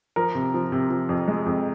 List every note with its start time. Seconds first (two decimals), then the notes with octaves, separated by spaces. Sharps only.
0.16 F3 A#4
0.35 C3
0.54 F3
0.72 C3
0.90 F3
1.09 F2
1.28 G#3
1.46 F2